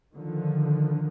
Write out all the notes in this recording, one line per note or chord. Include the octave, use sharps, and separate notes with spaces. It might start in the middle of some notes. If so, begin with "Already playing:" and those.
D3 D#3 F3